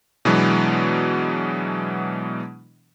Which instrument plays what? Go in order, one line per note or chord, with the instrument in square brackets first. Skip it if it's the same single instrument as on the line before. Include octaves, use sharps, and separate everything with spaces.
[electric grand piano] B2 E3 F#3 G#3 B3 D4